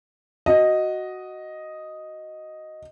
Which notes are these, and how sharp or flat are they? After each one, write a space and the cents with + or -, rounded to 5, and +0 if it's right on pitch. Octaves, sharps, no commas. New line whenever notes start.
F#4 +0 D#5 +0